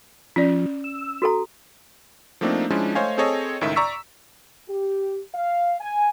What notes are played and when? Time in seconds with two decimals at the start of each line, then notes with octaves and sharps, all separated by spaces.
0.36 F3 C#4 D5
0.84 E6
1.22 F#4 A4 A#5
2.41 F3 A3 A#3 C4 D4 D#4
2.70 F3 G#3 C#4 D4 E4
2.95 A3 C5 C#5 D#5 F5 G#5
3.18 C4 G#4 A4 C#5 D#5
3.61 C#2 A2 D#3 E5
3.76 D5 A#5 C#6 E6 B6
4.69 G4
5.35 F5
5.81 G#5